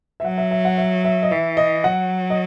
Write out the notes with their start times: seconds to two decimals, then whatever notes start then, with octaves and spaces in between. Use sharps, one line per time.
0.20 E5
0.24 F#3 F#5
0.38 E5
0.51 E5
0.65 F#5
0.78 E5
1.05 E5
1.23 D#5
1.31 E3 E5
1.57 D#5
1.84 F#3 F#5
2.30 D#5